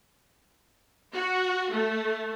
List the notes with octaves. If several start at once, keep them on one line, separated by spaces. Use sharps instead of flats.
F#4
A3